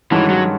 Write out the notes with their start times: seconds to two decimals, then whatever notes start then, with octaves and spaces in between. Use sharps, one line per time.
0.11 G2 D#3 E3 G#3 C#4 F#4
0.30 F#3